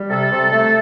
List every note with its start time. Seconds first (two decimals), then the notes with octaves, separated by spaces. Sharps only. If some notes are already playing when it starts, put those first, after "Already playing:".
Already playing: G3
0.10 C3 A4
0.31 C3
0.52 A3